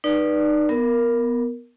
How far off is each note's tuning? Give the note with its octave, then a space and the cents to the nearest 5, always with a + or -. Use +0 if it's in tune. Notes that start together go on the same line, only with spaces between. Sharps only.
D#4 -25 B4 -25 D5 +0
B3 +0 A#4 +0